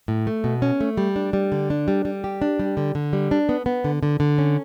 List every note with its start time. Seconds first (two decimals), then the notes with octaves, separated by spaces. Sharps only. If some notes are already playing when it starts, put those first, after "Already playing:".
0.08 A2
0.27 A3
0.44 B2
0.62 C#4
0.81 A3
0.97 G3
1.16 D4
1.33 G3
1.52 D3
1.70 D4
1.88 G3
2.05 G3
2.24 G4
2.42 D4
2.59 G3
2.77 D3
2.95 D3
3.13 G3
3.31 D4
3.49 B3
3.66 B3
3.84 D3
4.03 D3
4.20 D3
4.38 C#4